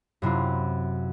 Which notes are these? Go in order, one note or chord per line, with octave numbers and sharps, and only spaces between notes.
F#2 C3 E4 F4